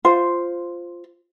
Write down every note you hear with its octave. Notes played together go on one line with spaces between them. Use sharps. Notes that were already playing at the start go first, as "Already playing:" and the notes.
F4 C5